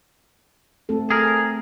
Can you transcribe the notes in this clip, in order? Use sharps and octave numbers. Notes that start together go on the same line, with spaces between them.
A3 C4 A4
G#4 A#4